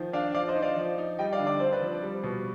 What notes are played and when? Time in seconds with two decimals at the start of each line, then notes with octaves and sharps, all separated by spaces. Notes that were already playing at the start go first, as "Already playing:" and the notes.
Already playing: D#3 F3
0.13 D4 D5 F5
0.34 F3 D5 F5
0.48 C5 D#5
0.56 D#4
0.63 D5 F5
0.76 F3
0.98 D#4
1.19 G3 D#5 G5
1.33 D5 F5
1.39 D3
1.47 D5
1.59 C4 C5
1.72 B4 D5
1.82 F3
2.02 G3
2.23 B2